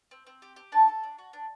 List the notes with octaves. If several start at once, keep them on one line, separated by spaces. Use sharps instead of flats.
C4
C4
G4
G4
D4 A5
A4
D4
F#4
D4